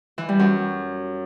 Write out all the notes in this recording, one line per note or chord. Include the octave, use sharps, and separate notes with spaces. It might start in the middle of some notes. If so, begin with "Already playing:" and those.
E3
G3
F#2